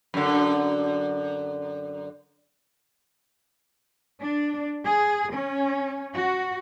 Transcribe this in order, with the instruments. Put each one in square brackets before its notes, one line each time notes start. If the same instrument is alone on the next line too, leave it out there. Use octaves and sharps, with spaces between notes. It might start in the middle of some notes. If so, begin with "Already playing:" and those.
[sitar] F#2 D3
[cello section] D4
G#4
C#4
F#4